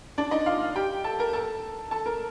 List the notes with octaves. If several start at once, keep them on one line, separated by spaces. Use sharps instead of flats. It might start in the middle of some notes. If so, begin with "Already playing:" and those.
D4 D5
D#4 D#5
F4 F5
G4 G5
A4 A5
A#4 A#5
A4 A5
A4 A5
A#4 A#5